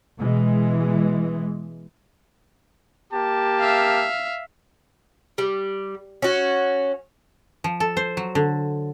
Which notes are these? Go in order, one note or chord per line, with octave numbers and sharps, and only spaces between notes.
B2 E3 G#3
A#3 G4 A5
E5 F5
G3
C#4 F#4
F3
A4
C5
F#3
D3